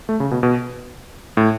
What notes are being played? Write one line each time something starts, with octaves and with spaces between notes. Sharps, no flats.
A3
C#3
B2
B2
A2